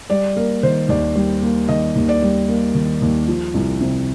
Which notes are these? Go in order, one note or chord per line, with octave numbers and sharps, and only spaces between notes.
G3 D5
A#3 A#4
D#3 C5
D#2 D5
G3
A#3
D#3 D#5
D#2
D5
G3
A#3
D#3
D#2
F3
C2
C3